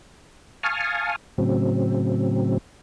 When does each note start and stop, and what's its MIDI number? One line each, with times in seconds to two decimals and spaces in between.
0.63 1.16 77
0.63 1.16 80
0.63 1.16 81
0.63 1.16 85
0.63 1.16 87
0.63 1.16 89
1.38 2.58 45
1.38 2.58 49
1.38 2.58 54
1.38 2.58 60